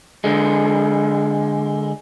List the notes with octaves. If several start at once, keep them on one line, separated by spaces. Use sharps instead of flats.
D3 G#3